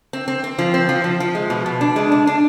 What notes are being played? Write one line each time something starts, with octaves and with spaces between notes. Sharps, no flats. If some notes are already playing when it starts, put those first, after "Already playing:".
C4
C4
C4
F3
C4
F3
F3
F3
G#3
B2
B2
D4
G#3
D4
D4